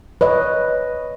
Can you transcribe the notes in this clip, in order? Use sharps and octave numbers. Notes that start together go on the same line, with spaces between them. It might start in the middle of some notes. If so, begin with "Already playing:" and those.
B4 C#5 D#5